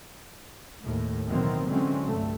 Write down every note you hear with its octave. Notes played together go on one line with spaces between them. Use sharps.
D#2 A2
B2 D#3 E3 F#3 A#3 C4
D3 E3 F#3 G#3 C4 C#4
C2 G2 A3